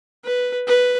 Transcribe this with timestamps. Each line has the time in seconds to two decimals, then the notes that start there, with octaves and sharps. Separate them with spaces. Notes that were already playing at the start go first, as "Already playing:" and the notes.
0.24 B4
0.67 B4